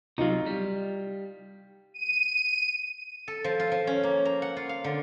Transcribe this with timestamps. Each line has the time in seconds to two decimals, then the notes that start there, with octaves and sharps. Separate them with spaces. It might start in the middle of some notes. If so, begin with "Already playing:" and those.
0.18 C3 F#3 D#4 F4
0.46 G3
1.94 D#7
3.28 A4
3.44 F3
3.59 F4
3.72 F3
3.87 C#4
4.03 A#3
4.25 A#5
4.42 F#5
4.57 F4
4.69 F5
4.84 D3